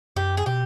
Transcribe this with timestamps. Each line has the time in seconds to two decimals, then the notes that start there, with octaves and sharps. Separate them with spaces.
0.16 F#2 G4
0.37 G#4
0.46 B2 G4